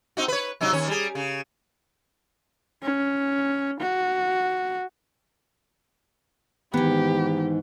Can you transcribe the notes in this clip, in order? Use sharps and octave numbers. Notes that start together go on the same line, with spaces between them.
C4 D#4 F#4
B4 C#5
C3 F#3 D#4
D#2 C#4 C#5
G3 G#4
C#3
C#4
F#4
G#2 D#3 E3 B3 G4